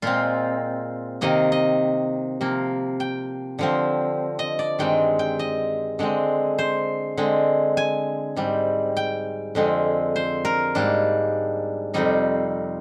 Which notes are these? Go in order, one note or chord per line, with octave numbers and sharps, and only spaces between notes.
A#2 G#3 C4 F4
C3 D#3 A#3 D#5
D#5
C3 F3 A#3
G5
D3 F3 C4
D#5
D5
G2 D#3 G#3 C4 G5
G5
D#5
D3 G#3 C4
C5
D3 G#3 C4
G#5
G#2 G3 C4
G5
F2 D3 G#3 C4
C5
A#4
G#2 G3 A#3 D4
F2 C3 G3 C4 D#4